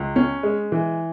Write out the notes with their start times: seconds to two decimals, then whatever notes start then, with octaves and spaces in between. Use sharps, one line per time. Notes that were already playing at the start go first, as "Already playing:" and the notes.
Already playing: C#2
0.16 C#4
0.43 G#3
0.72 E3